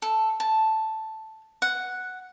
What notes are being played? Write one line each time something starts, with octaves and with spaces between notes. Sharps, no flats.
A4
A5
F#5